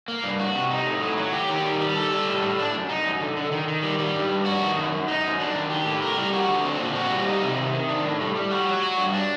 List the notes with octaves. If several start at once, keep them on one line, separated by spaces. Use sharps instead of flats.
A#3
G2
F#4
C3
D#4
A2
F#3
F#3
G4
D#3
G3
G3
A4
G3
A2
A2
D4
F#2
D#4
F#2
D3
D3
D#3
D#3
G3
G3
G2
G2
F#4
D#3
F#2
F#2
D#4
F#2
D4
D#3
G4
A2
A#4
G3
F#4
D3
C4
A#2
F#4
G3
D#4
C3
D#3
D#3
D4
A2
G3
G3
F#4
F#3
F#4
G2
D4